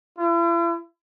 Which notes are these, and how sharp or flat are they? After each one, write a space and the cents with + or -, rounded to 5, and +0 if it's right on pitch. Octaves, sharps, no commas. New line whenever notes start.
E4 +45